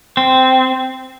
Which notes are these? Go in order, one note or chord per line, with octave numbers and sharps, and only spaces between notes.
C4